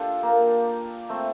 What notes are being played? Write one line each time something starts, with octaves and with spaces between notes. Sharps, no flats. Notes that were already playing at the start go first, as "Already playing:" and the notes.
Already playing: D4 F4 G4 A4
A#3
A3 C4